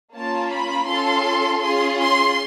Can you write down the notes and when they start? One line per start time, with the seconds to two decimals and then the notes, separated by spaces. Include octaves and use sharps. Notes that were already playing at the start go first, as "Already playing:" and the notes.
0.13 A#3 C#4 F4 A5
0.51 B5
0.88 C#4 F4 A4 C6
1.62 C#4 F4 G#4 C6
1.99 C6